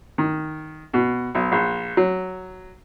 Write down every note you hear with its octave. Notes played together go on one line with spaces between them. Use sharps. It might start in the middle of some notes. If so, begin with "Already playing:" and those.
D#3
B2
B1
A#1
F#3